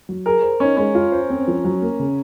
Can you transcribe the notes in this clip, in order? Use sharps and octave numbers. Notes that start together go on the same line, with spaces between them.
F#3
G#4 A#4
C5
C#4 D#4
G#3 C#4
F4
C5
C4
F3
F#3
A#3
C#3